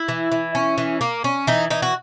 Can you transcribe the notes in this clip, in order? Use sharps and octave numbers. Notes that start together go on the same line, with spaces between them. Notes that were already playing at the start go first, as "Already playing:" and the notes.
Already playing: E4
E3
E3
C#4
E3
A#3
C#4
E3 D#4
E3 D#4
F#4